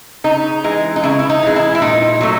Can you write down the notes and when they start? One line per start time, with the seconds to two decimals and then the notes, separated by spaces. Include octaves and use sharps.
0.24 C#3 D#4
0.64 E3 G#3
0.96 D#4
1.03 C#3 E4
1.19 E4
1.30 D#4
1.43 E3 G#3
1.56 E4
1.75 E4
1.82 A#2 D#4
2.21 F#3 A3